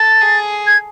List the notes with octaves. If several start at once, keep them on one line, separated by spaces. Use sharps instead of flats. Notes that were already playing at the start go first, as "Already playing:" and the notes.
Already playing: A4 A6
G#4
G#6